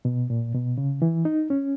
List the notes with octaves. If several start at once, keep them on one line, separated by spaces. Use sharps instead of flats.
B2
A#2
B2
C#3
E3
D#4
C#4